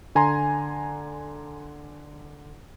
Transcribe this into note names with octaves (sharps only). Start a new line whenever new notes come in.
D3 G#5 A#5 C6